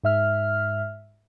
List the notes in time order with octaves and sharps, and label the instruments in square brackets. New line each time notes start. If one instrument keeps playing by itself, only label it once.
[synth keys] G#2 E5 F6